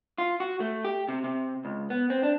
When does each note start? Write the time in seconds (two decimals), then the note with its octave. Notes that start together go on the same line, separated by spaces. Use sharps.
0.18 F4
0.40 F#4
0.60 A3
0.85 G4
1.08 C3
1.24 C3
1.65 C#2
1.90 B3
2.10 C4
2.23 D4